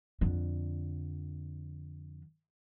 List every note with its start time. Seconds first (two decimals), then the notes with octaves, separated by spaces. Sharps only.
0.21 F2 D3